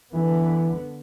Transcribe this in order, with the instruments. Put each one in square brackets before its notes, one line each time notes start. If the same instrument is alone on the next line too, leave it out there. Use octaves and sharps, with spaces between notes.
[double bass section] D3 B3 [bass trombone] E3